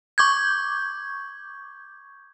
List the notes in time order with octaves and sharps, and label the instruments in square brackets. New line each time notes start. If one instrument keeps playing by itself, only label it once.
[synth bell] C#6 D6 G6 G#6